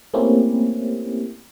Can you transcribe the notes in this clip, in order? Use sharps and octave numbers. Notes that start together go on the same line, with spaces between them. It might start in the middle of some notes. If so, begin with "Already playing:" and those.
A3 A#3 C4 C#4 E4 G4